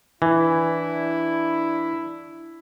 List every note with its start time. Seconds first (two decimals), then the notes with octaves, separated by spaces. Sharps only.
0.22 E3 D4 E4